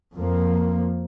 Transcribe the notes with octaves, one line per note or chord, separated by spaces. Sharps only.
F2 F3 A#3